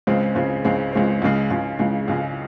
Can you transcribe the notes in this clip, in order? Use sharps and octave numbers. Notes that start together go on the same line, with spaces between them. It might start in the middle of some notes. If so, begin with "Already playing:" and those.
C#2 C#3 G#3 C4
C#2 C#3 G#3 C4
C#2 C#3 G#3 C4
C#2 C#3 G#3 C4
C#2 C#3 G#3
C#2 C#3 G#3
C#2 C#3 G#3
C#2 C#3 G#3